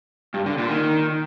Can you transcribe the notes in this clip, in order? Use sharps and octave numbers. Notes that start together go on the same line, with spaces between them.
G2
D3
A#2
D#3